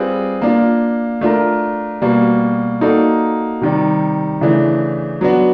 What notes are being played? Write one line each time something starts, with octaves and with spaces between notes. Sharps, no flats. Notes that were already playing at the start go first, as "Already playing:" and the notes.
Already playing: G3 C4 F4 G#4 B4
A#3 D4 F4
A3 D4 F4 A#4
B2 G3 A#3
A#3 D#4 F#4 A4 D5
C3 D#3 G3
C#3 E3 A3 D4
F#3 B3 D4 F#4